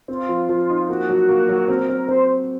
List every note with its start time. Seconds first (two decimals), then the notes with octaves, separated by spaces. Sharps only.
0.08 C4 F4
0.29 F3
0.49 F3
0.69 D#4
0.89 A#3 F#4
1.09 F#3
1.29 A#3
1.49 F#3
1.68 C4 A#4
1.89 C4
2.09 C4 C5